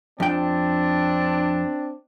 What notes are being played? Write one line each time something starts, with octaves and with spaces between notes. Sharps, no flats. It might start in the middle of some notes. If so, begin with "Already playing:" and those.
F2 C4 D4 G5